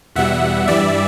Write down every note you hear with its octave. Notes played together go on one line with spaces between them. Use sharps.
E2 B2 G3 E5 F#5
G2 E3 G3 D5 E5